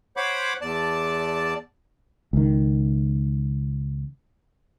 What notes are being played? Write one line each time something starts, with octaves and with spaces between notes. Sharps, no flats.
C5 C#5 F#5 B5 D6
E2 D5 A5
C#2 D#3